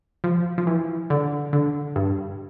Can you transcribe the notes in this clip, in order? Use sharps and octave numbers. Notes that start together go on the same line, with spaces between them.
F3
F3
E3
D3
D3
G2